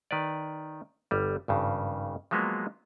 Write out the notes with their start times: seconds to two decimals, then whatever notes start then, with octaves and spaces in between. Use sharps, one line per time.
0.11 D#3 B4 D5
1.11 G1 G3
1.48 G#1 G2 C#3
2.31 F3 F#3 G#3 A#3 B3